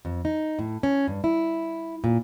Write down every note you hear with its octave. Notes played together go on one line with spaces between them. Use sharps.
F2
D#4
A2
C#4
G2
E4
A#2